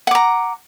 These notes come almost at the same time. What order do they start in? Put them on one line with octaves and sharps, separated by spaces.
F#5 D6 A#5